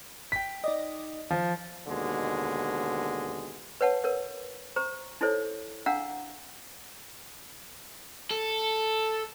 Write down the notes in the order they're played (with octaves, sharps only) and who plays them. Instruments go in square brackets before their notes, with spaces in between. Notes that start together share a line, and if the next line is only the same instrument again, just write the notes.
[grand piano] G5 B6
[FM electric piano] D#4 D5 D#5
[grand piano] F3
[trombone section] D#2 B2 D3 G#3
[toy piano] B4 C#5 F#5 A5
A#4 B4 C#5
C5 A#5 C#6
D#4 E4 A4 C5 C#5
D4 F5 F#5 A#5 E6
[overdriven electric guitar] A4